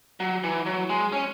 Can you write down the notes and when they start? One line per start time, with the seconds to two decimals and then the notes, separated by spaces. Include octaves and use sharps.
0.20 F#3
0.44 E3
0.66 F#3
0.90 G#3
1.12 C#4